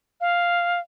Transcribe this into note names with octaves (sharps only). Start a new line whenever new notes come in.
F5